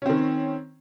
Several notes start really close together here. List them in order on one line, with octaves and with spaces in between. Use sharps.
C#4 C4 D#3